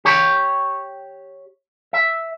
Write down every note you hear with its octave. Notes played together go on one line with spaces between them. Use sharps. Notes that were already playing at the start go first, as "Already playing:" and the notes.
G4 C#5
E5